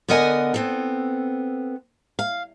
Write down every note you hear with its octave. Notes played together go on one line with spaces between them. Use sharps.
D3 B3 A#4 D#5 F#5 G#5
B3 C4 A4
F5